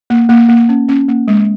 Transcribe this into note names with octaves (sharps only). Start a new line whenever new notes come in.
A#3
A#3
A#3
C#4
C#4
A#3
G#3